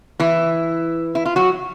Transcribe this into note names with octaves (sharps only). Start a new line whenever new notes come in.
E3 E4
E4
F4
F#3 F#4